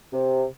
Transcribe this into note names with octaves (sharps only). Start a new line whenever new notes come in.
C3